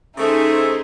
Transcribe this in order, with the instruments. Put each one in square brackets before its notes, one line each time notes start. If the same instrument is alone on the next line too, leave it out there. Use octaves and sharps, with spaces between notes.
[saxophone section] C#3 A3 [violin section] D#4 G#4 C5 [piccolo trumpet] E5